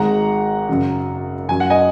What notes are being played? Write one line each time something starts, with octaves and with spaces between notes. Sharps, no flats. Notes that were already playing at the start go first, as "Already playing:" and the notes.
Already playing: G#1 G#2 G#3 F#5 A#5
F#2 C#3 F#3
F#2 F#3 G#5
F#5
D#5 G#5